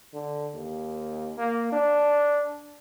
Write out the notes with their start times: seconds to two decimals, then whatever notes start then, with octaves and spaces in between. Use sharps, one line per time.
0.13 D3
0.54 D#2
1.37 A#3
1.72 D4